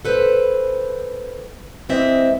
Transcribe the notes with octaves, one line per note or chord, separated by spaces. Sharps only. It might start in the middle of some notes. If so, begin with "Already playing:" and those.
A4 B4 C5
E3 G#3 C4 D#5 E5